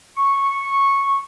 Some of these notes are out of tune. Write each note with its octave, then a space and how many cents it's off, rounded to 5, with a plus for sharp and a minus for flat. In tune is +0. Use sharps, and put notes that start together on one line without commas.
C#6 -10